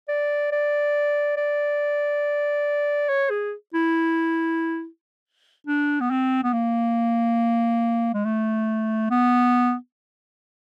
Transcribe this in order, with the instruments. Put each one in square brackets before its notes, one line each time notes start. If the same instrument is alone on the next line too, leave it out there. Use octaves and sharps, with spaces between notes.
[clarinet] D5
D5
D5
C#5
G#4
E4
D4
B3
C4
B3
A#3
G#3
A3
B3